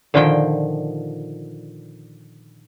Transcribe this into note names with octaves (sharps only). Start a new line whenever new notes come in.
A#2 D3 D#3 F3 G5